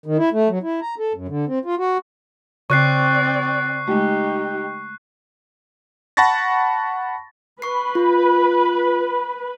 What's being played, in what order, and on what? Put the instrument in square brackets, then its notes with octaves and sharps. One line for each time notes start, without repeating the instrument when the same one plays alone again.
[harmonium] D#3
E4
A3
F#3
E4
A#5
A4
F#2
D3
C4
F4
F#4
[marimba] C#3 [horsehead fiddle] C4 D5 [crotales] C#6 F#6 C7
[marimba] G#3 A3 [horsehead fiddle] D#4 G4
[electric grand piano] F#5 A5 B5 C#6 A6 A#6
[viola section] B4 [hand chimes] C#6 C7
[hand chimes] F4